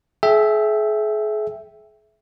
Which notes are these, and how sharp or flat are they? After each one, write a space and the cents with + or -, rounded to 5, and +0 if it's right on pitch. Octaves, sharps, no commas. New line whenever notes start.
G#4 +40 E5 +0 G5 +0